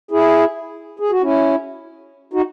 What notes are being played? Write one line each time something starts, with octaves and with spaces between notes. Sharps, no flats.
E4 G#4
G#4
F#4
C#4 E4
D#4 F#4